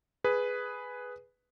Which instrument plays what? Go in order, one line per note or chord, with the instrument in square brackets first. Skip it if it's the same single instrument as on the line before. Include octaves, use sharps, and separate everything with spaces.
[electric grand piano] G#4 B4